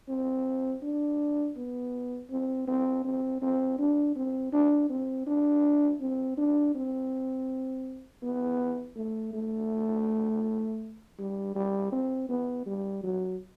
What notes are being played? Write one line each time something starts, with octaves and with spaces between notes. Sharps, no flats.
C4
D4
B3
C4
C4
C4
C4
D4
C4
D4
C4
D4
C4
D4
C4
B3
A3
A3
G3
G3
C4
B3
G3
F#3